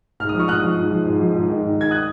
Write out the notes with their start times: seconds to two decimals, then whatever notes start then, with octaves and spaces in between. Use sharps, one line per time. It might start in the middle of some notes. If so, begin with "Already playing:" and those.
0.20 G#2 F6
0.29 D#6
0.34 F3
0.39 C#6 F6
0.48 G#2 D#6 F#6
0.63 F3
0.77 G#2
0.91 F3
1.05 G#2
1.19 F3
1.35 G#2
1.48 D#3
1.62 G#2
1.77 D#3 G#6
1.91 D#6 F#6